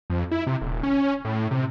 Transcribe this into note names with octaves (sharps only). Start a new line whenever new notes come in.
F2
E4
C3
D#1
C#4
A2
C3